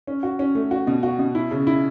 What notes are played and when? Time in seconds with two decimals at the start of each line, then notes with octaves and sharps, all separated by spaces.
0.07 C#4
0.23 F#4
0.39 C#4
0.55 A3
0.71 F#4
0.87 B2
1.03 F#4
1.19 B2
1.35 E4
1.51 C#3
1.67 E4